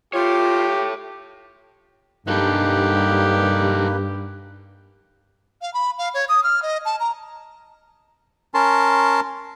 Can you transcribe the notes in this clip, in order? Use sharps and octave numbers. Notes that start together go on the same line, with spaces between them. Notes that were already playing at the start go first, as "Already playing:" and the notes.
F4 G4 A4 C#5
G2 A#3 D#4 G4 A4 B4
F5
B5
F5
C#5
D#6
F6
D#5
A5
A#5
C#4 A#4 A5 C6